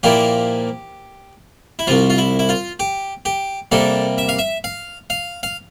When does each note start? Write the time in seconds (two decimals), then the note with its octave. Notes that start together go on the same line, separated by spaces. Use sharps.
0.03 A#2 F3 A#3 E4 G4
1.79 E4
1.87 C2 C3 F3 F4
2.10 F4
2.18 E4
2.39 E4
2.49 F4
2.80 G4
3.25 G4
3.72 C3 G3 A#3 A4
4.18 E5
4.29 F5
4.39 E5
4.64 F5
5.10 F5
5.43 F5